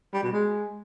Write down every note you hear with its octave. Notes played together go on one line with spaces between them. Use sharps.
G3
B2
G#3